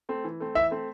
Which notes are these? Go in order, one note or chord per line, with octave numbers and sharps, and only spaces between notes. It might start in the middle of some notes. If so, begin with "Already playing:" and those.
A3 C4
E3
A3 C4
E3 E5
A3 C4